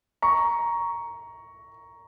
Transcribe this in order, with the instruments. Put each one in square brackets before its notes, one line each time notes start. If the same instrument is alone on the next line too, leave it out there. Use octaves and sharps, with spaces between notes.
[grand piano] A#5 C#6